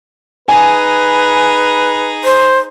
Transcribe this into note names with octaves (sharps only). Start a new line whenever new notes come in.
D#4 G#4 B4 G#5
C5